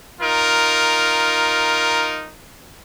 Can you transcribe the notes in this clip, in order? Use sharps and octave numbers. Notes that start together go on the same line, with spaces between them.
D#4 F4 A#4